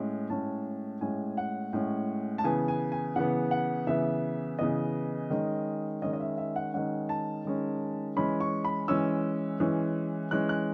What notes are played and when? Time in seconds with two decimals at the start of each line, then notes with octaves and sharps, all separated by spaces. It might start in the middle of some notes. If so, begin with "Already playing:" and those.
Already playing: A2 G#3 C#4
0.30 A2 G#3 C#4 A5
1.01 A2 G#3 C#4 G#5
1.37 F#5
1.73 A2 G#3 C#4
2.38 A5
2.44 C#3 E3 B3 G#5
2.68 G#5
2.92 G#5
3.16 C#3 E3 B3 F#5
3.51 F#5
3.87 C#3 E3 B3 E5
4.59 C#3 E3 B3 D#5
5.30 D#3 G#3 C#4
6.02 D#3 G#3 C#4 D#5
6.13 D#5
6.20 E5
6.38 E5
6.56 F#5
6.74 D#3 G#3 C#4 F#5
7.09 A5
7.45 D#3 G#3 C#4
8.17 E3 G#3 C#4 B5
8.40 C#6
8.65 B5
8.88 E3 G#3 C#4 E6
9.60 E3 G#3 C#4
10.31 E3 G#3 C#4 F#6
10.49 F#6